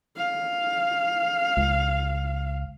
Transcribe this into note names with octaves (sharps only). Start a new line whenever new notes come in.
F5
C#2